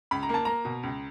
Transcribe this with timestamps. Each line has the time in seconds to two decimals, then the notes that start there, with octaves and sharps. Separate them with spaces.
0.11 C#2 B5
0.23 A#5
0.29 A#3 A5
0.45 A#3 A#5
0.65 B2
0.83 C#2